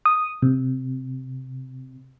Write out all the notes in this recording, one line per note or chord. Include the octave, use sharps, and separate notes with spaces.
D#6
C3